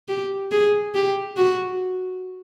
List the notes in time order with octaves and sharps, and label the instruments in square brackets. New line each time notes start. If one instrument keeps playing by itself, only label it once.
[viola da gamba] G4
G#4
G4
F#4